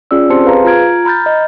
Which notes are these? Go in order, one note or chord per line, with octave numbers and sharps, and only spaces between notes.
C#4 F4 G#4 D5 E6
C4 G4 C5 A5 C6 C#7
G#4 B4 F5 A#5
F4 A#5 F6 G#6 D7
A#5 B5 F6 G6 A6
D#5